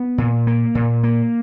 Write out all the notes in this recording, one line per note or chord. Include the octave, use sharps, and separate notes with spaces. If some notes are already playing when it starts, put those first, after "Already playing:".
Already playing: B3
A#2
A#3
A#2
A#3